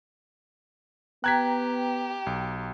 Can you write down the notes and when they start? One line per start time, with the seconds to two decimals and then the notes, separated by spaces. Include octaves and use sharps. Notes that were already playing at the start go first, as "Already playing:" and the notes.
1.24 B3 G4 G5 A#5 F#6 G#6 B6
2.26 B1